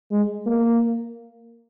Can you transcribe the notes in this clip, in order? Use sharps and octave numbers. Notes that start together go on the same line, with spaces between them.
G#3
A#3